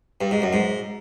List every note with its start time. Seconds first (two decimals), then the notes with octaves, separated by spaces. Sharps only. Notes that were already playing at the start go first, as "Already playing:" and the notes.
0.21 G2
0.31 G#2
0.42 F#2
0.53 G#2